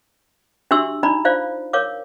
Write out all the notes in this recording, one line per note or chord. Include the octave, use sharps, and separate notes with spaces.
D4 F#4 G4 E5 C6 E6
D4 D#4 D5 A#5 B5
F4 C5 D5 F5
A#4 C#5 F5 D6